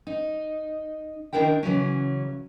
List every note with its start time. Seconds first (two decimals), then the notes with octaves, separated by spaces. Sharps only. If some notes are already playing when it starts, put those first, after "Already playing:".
0.07 D#4
1.33 D#3 G#3 D4 E4 A#4 G5
1.63 C#3 E3 F#3 C#4